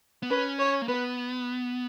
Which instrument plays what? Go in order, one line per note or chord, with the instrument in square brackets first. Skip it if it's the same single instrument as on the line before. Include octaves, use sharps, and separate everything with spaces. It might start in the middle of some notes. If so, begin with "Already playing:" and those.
[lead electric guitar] B3
[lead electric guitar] C#4 [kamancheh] B4
[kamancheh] C#5
[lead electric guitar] A#3
[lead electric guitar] B3 [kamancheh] B4